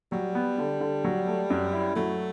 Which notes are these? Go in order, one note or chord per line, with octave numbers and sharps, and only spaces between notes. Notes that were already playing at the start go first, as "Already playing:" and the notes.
F#3 G3
B3
D3
D3
F#3
A3
F#2
E4
F#3 A3